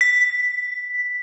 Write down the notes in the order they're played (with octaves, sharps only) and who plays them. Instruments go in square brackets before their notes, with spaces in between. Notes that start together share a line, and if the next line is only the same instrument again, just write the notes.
[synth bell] B6